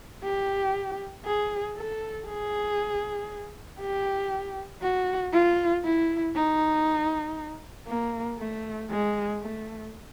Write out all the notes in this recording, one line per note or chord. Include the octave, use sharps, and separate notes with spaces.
G4
G#4
A4
G#4
G4
F#4
F4
E4
D#4
A#3
A3
G#3
A3